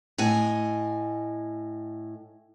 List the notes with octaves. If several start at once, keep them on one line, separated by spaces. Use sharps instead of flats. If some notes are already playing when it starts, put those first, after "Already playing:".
A2 D#5 G#5